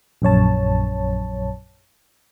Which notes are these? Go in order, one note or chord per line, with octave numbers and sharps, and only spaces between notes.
A#1 F#2 C#5 A5